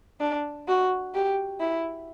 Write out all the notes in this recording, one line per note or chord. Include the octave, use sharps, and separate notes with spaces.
D4
F#4
G4
E4